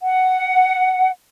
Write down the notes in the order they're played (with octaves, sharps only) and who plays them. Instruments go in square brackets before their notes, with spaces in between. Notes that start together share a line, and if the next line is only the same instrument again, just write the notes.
[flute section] F#5